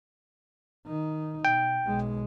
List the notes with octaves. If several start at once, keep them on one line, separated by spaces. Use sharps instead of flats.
D#3 D#4
B2 G5
B1 G#3